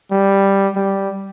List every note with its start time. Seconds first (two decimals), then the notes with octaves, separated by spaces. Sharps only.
0.12 G3
0.76 G3